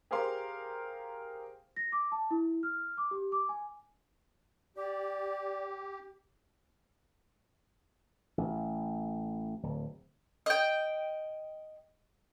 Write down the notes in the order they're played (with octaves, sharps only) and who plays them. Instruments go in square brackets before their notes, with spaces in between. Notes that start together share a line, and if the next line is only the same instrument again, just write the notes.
[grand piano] G4 G#4 A#4 C5 F5 C6
[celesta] A#6
D6
A5
E4
F6
D6
G4
D6
G#5
[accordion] G4 [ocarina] D5
[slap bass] A1
D1
[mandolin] D#5 G5